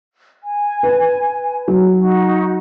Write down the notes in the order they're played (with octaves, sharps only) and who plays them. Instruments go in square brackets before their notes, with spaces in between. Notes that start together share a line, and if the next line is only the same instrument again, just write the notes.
[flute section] G#5
[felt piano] B4
F#3
[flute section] D#4 F#4